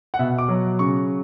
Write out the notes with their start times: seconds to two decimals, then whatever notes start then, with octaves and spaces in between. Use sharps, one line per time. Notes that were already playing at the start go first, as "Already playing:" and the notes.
0.14 F#5
0.19 B2 E5
0.38 D6
0.48 F#3
0.79 C#3 C#6